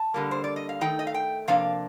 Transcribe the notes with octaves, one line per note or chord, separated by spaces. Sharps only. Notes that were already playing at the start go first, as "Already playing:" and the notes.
Already playing: A5
D3 G3 A#3
C5
D5
D#5
F5
D#3 A3 D#4 G5
D#5
F5
G5
C3 F3 A#3 D4 F5